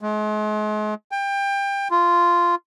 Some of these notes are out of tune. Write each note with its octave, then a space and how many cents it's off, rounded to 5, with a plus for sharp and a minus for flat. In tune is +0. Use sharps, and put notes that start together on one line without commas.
G#3 +40
G5 +25
F4 -10